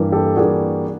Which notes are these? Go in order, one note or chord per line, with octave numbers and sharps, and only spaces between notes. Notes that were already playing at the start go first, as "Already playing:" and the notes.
Already playing: G2 E3 G3 A#3
G4 A4
G2 E3 G3 A#3 F#4 G#4